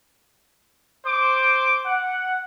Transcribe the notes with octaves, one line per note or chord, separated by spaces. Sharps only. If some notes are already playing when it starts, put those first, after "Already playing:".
C5 D6
F#5